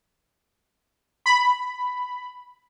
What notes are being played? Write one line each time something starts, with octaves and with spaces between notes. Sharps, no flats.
B5